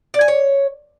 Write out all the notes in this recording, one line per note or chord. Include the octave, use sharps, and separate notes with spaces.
D5
G#5
C#5